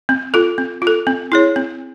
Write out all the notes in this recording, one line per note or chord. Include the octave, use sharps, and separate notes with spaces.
C4
F4 A4
C4
F4
A4
C4
E4 G#4 C#5
C4